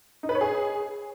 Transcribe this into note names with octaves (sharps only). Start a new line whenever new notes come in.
D#4
B4
C#5
G#4